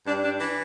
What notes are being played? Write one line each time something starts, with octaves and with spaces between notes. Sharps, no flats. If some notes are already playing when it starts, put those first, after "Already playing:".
G2 D4
D4
E3 D4